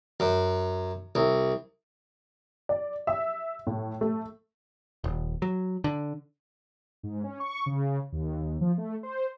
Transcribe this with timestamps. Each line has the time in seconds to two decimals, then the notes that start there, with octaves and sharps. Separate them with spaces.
0.20 F#2
1.15 C2
2.69 D5
3.07 E5
3.67 A2
4.01 A3
5.04 D#1
5.42 F#3
5.84 D3
7.03 G#2
7.24 C#4
7.40 C#6
7.66 C#3
8.12 D#2
8.61 F3
8.78 A3
9.03 C5